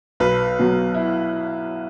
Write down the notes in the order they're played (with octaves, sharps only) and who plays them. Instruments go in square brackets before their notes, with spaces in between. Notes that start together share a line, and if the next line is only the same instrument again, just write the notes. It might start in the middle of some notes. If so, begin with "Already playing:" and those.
[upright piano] B1 [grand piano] B4
[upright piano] B2 F#3
[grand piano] E4